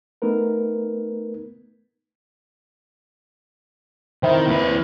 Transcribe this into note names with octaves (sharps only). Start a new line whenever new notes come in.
A3 B3 D#4 A#4 B4
D#3 C4 E4
D#2 B4